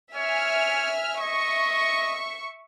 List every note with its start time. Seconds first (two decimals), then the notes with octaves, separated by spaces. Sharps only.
0.16 C#5 E5 G#5 F6
1.20 D#5 E5 C#6